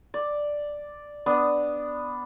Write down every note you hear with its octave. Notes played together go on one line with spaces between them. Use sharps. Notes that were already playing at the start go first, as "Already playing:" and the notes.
D5
B3 D4 D#6